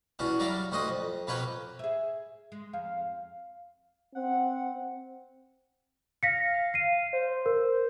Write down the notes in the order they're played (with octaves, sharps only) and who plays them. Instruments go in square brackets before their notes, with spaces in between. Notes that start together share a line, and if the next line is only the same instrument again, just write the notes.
[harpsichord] E2 C#4 D4 F#4
F#3 G3 A#4 D5 E5 F5
D2 G2 F#4 C5 D#5 D#6
F2
F2 B2 A#3 B4 C#5 G5
[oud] G#4 E5
G#3
[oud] F2 [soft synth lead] F5
[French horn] C4 [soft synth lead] F#5
[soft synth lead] F5 [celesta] A#6 B6 C#7
[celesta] C7 D#7
[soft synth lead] C5
[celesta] A#4